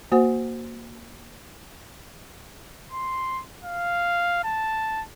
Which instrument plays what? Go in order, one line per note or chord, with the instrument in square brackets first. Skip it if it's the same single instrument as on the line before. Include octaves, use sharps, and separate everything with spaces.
[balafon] A#3 F#4 C5 F#5
[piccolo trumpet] C6
F5
A5